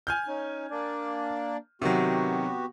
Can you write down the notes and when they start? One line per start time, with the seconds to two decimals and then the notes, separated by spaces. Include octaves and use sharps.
0.07 G#5 F6 G6
0.27 C#4 D#4
0.71 A#3 D4 D5
1.82 C3 D#3 F#3 B3 F#4 G4